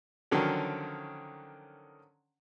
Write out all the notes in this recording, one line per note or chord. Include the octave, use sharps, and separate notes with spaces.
D3 D#3 F3 F#3 C#4